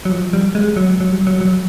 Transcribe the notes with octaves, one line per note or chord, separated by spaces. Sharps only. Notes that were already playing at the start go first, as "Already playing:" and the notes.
F#3
F3
G3
G#3
F#3
F#3
G3
F#3
F#3